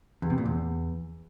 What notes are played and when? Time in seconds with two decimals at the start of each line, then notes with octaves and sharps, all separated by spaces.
0.22 E2
0.30 C3
0.38 A#2
0.45 E2